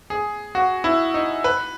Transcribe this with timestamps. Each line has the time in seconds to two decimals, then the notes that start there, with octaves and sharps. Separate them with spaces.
0.10 G#4
0.55 F#4
0.84 E4
1.14 D#4
1.44 B4